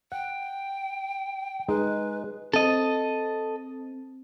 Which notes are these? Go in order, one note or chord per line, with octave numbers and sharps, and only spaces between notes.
F#5 G5
G#3 D#4 B4
C4 A4 D#5